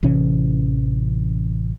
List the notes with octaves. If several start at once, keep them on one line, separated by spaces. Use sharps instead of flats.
A1 C3 E3 C#4